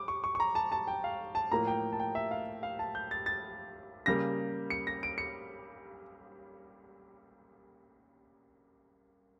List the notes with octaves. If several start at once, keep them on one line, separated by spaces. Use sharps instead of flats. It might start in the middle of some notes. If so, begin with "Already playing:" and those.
Already playing: D6
C#6
C#6
C#6
A#5
A5
A5
G5
F5
A5
A2 F3 A#3 A#5
G5
A5
G5
E5
F5
F5
A5
G6
A6
A6
C#3 G3 A#3 A#6
C#7
A#6
D7
C#7